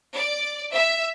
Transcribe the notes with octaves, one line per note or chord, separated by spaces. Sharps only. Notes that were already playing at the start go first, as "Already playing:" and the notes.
D5
E5